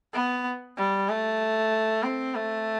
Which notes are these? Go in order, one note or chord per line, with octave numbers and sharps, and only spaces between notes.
B3
G3
A3
C4
A3